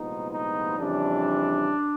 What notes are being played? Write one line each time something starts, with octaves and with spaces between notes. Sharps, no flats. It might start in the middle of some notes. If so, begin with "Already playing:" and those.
Already playing: C2 A#2 F3 G#3 B3 D#4
D#4
F2 C#3 E3 G3 D4